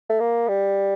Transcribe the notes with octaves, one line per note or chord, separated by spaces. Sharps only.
A3
A#3
G3